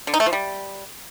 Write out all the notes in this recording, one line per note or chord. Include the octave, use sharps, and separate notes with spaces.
D3
D#4
A3
F3
G3